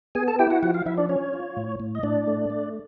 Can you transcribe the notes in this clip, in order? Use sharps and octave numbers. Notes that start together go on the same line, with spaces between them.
B3 G#4 G#5
A4 A5
E4 G4 G5
F#4 F#5
F3 F#4 F#5
F4 F5
F3 E4 E5
D4 D5
C#4 C#5
F4
A2
A2
D#5
A2 D4 D5
A3
A3